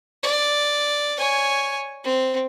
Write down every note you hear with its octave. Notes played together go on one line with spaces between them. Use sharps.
D5
C#5 G#5
C4